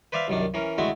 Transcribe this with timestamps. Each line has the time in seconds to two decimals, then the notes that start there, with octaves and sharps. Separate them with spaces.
0.12 B4 C5 D5 E5 F5
0.28 C2 F#2 D#3 D4
0.54 E3 C#4 A#4
0.78 D3 G#3 A3 C4 E4 F#4